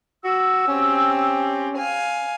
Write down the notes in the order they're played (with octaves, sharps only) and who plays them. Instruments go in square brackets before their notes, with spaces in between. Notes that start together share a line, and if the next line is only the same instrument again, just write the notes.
[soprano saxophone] F#4 [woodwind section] E6
[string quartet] C4 G4 [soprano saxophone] C#4
[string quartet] F5 G#5